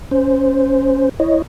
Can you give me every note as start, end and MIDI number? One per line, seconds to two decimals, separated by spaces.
0.11 1.09 61
0.11 1.09 72
1.20 1.42 64
1.20 1.42 73
1.20 1.42 75